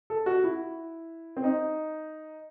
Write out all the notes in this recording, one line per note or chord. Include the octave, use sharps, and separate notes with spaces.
A4
F#4
E4
C4
D#4